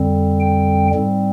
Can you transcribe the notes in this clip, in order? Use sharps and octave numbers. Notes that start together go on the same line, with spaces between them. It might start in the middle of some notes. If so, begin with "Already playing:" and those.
Already playing: F2 D3 G3 C4
G5
G#2 G3 C4